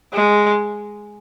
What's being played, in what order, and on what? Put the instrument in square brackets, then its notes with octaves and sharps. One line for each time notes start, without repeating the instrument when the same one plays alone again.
[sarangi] G#3